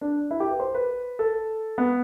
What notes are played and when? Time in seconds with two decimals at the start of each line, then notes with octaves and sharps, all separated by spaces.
0.01 D4
0.31 E4
0.40 G4
0.50 B4
0.60 C5
0.75 B4
1.19 A4
1.78 B3